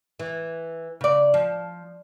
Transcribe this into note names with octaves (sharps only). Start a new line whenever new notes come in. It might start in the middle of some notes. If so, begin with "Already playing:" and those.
E3
C#3 D5
F3